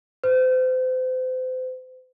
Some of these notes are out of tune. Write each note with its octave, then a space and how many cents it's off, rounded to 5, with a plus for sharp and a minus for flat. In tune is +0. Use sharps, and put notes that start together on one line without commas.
C5 -35